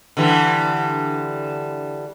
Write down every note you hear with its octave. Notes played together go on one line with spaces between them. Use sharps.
D3 E3 G3